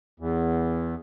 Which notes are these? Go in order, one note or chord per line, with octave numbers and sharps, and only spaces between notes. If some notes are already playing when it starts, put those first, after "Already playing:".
E2